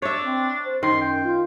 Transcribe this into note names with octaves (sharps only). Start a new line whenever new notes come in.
D4 C#5 E5
C4
C5
F#2 D#3 C6
G5
F4